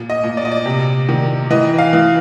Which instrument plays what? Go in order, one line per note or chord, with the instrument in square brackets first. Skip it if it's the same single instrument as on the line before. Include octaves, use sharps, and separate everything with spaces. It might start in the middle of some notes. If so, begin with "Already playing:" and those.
Already playing: [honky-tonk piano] A#2
D#5
A#2
D5
D#5
D5
C3
D#3
E3 D#5
F5
E3